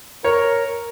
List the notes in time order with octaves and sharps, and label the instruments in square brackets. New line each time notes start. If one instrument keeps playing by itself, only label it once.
[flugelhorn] A#4 [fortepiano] C#5